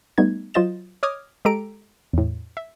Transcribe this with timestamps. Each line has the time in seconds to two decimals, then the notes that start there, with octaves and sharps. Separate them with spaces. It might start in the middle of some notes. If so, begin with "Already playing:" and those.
0.18 G3 A3 B3 D#4 G#6
0.54 F#3 F4 C5 D#5 A6 E7
1.03 C#5 D#5 D6 D#6 F6 G#6
1.45 G#3 G4 A4 A#5 D7
2.13 E2 A2
2.57 E5